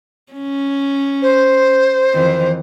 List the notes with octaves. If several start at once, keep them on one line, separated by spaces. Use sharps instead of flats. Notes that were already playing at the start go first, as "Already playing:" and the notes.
C#4
C5
F2 D#3 E3